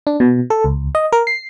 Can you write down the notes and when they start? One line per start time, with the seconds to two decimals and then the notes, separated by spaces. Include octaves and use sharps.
0.07 D4
0.20 B2
0.50 A4
0.64 C#2
0.95 D#5
1.13 A#4
1.27 C7